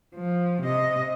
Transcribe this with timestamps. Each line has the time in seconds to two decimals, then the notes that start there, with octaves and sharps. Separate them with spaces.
0.15 F3
0.62 C3 D#5